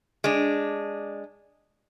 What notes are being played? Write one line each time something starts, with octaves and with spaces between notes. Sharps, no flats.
G#3 D4